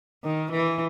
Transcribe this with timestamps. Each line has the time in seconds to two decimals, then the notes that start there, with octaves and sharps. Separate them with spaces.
0.23 D#3
0.51 E3